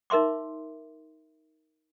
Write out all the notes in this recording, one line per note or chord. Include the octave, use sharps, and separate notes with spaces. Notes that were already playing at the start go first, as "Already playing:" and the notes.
D#4 A#4 E5 C6 D6